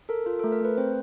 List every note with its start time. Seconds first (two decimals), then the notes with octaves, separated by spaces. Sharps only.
0.09 A4 A#4
0.26 F4 A#4
0.39 A4
0.44 A3
0.52 A#4
0.61 A3 B4
0.77 C4 C5